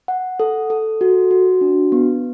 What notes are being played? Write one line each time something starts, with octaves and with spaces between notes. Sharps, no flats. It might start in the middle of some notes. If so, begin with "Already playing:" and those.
F#5
A4
A4
F#4
F#4
D4
B3